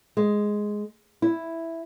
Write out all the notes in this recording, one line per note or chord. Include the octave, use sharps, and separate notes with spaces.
G#3
E4